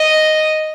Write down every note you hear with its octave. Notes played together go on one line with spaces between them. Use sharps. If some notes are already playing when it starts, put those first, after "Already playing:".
Already playing: D#5